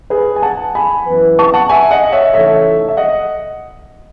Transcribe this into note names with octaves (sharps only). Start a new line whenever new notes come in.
G#4 B4
G#5
F#5 A5
G#5 B5
F#2 E3 B3 E4 B4
A5 C#6
F#5 A5
E5 G#5
D#5 F#5
C#5 E5
C#3 E3 A3 D#4 A4 C#5 E5
E5
D#5 F#5